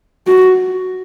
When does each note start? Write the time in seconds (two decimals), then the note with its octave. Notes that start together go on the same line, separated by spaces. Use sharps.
0.27 F#4